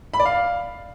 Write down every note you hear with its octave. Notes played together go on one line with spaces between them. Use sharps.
B5
D5
F5